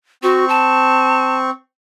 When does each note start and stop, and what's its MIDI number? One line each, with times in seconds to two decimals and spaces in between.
0.23 1.50 60
0.23 0.45 66
0.23 1.50 85
0.49 1.37 81